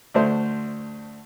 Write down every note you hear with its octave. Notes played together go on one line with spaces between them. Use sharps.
D2 A3 C5